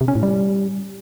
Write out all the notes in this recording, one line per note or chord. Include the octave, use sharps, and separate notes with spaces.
C3
C#4
A2
G3